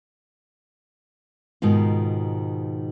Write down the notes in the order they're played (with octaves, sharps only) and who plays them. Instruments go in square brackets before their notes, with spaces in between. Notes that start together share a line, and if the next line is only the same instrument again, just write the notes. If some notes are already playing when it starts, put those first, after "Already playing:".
[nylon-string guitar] G#2 B2 D#3 F4